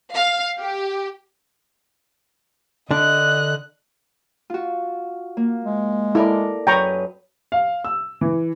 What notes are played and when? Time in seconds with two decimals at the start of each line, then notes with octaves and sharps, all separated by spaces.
0.13 F5
0.58 G4
2.91 D3 D4 D#5 F#6
4.50 F4 F#4
5.37 A#3
5.64 G#3
6.15 E4 A4 A#4 D5
6.67 F#2 B4 G5 A#5 C#6 D#6
7.52 F5
7.85 E6
8.21 E3